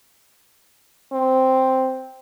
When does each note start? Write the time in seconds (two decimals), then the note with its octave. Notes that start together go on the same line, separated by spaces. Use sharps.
1.13 C4